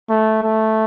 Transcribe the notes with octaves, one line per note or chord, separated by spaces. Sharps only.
A3
A3